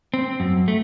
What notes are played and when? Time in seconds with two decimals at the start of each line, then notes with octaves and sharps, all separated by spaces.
0.14 C4
0.40 F#2
0.68 A3